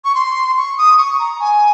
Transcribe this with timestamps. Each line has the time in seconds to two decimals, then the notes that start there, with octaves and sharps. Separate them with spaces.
0.05 C#6
0.15 C6
0.57 C#6
0.78 D#6
0.98 C#6
1.19 A#5
1.40 G#5